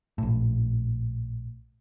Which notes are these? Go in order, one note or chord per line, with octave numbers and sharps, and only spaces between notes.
A#1 A2